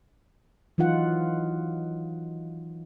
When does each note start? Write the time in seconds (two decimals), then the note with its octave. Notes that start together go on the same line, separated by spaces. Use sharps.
0.78 E3 F#3 D#4 F4 F#5